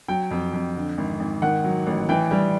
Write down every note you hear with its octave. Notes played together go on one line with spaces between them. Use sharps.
F#3 G5
F2
F2
D3
G#1
G#1
D#3 F#5
F#3
A1
E3 G5
G3